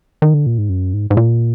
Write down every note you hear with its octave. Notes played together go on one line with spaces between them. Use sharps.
D#3
D3
A#2
G#2
F#2
G#2
G#2
A#2